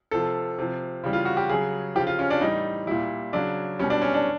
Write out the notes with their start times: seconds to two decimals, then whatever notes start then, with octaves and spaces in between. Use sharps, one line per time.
0.11 C3 F3 A4
0.58 C3 F3
1.03 C#3 E3 G3
1.13 F4
1.25 F#4
1.37 G4
1.49 C#3 F#3 G#4
1.95 F3 G4
2.00 C#3
2.07 F4
2.19 C#4
2.30 D4
2.41 A2 E3 G3 D#4
2.87 A#2 G3 E4
3.33 C#3 F#3 D4
3.79 B2 G3 C#4
3.90 D4
4.02 C#4
4.14 D4